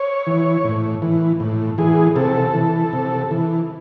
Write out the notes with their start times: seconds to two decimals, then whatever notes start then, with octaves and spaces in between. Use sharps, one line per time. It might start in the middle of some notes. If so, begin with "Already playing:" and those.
Already playing: C#5
0.27 E3
0.64 A2
1.02 E3
1.40 A2
1.78 E3 G#4
2.16 C3 A4
2.54 E3
2.93 C3
3.31 E3